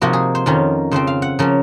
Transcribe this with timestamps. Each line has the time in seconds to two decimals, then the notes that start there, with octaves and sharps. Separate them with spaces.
0.02 C3 F3 A#3 D#4 F#4
0.13 G#4
0.35 C5
0.46 F2 D#3 A#3 C#4 F4
0.91 C#3 F3 C4 C5
1.07 F5
1.22 F#5
1.39 C#3 F3 A#3 C#4